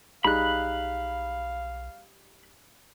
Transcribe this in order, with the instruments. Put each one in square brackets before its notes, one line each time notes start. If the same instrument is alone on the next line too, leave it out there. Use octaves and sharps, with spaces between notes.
[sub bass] B1 [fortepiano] G3 D#4 G#4 [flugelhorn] F5 [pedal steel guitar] B5 F#6